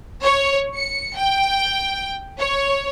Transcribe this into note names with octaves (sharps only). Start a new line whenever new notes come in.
C#5
C#7
G5
C#5